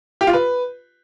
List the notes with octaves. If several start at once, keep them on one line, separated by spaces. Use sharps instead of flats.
G4
F4
B4